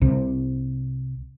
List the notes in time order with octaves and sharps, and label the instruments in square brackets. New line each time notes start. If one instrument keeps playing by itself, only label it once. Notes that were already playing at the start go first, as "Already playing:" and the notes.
[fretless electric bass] C2 C3